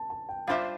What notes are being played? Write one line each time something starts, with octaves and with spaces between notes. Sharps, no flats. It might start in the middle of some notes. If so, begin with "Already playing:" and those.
Already playing: A5
A5
G5
G3 D4 F4 C5 E5 F5